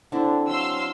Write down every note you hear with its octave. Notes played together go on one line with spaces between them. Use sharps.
D3 C4 D4 E4
F#3 F5 C6 E6